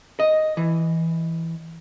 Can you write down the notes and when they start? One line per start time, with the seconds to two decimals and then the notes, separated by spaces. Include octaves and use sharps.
0.20 D#5
0.57 E3